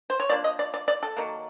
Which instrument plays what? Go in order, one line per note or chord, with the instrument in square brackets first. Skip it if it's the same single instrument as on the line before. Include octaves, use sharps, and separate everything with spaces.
[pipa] C5
C#5
F3 A#3 D4 D5
D#5
D5
D5
D5
A4
D#3 F#3 A#3